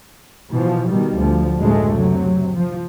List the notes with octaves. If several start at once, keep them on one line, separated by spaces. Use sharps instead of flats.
B2 E3 F3
B2 D#3 G3
D2 F3
F#1 D2 A2 G#3 A3
C3 F#3
F3